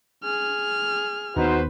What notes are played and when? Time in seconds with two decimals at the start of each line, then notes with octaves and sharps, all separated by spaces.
0.24 G#4 F6
1.36 D#2 B3 D#4 F#4 B4 C5